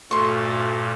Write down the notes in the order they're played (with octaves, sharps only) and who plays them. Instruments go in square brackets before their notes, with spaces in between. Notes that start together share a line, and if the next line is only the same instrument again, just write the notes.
[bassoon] D2 [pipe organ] G2 A#2 [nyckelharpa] A3 [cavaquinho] C6 C#6